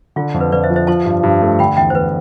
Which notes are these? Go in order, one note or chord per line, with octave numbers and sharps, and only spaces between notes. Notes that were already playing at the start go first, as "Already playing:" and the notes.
D3 F4
F2
B4
F2 B4 D5
C5 E5
F3
C5 E5
F3 A5 C6
G2
G2
A3
D3 G5 B5
E2 E5 G5
C5
E2 B4